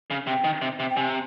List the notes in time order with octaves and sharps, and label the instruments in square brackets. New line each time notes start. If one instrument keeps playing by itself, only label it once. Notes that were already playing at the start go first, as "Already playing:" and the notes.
[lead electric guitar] C#3
[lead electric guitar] C3 [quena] G5
[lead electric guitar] D#3
C3
C3
[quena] G5
[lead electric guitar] C3 [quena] G#5